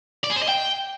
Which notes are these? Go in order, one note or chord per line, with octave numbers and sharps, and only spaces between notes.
D5
G#4
C5
D#5
G5